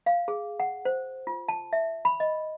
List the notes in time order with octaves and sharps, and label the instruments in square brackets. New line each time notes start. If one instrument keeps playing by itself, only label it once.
[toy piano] F5
G#4
F#5
C5
F4
A5
E5
B5
D#5